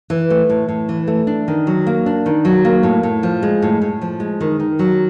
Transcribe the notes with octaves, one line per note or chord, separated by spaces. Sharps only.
E3
A3
A2
A2
E3
A3
D4
D#3
F#3
A#3
D4
D#3
F#3
A#3
A2
A2
F3
G#3
A2
A2
F3
G#3
D#3
D#3
F#3